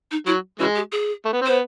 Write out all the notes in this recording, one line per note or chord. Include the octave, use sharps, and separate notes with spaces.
D#4
F#3 E4
C#3 E3 G#3 F#4
G4
G#4
A3
B3
C4
B3 C5